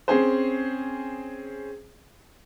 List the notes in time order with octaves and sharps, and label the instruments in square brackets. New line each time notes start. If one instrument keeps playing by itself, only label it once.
[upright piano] C4 C#4 G#4 C5